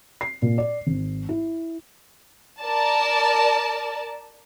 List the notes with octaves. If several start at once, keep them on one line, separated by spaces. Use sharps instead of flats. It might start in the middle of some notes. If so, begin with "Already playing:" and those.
C7
A#2
D5
G#1
E4
A#4 D5 A5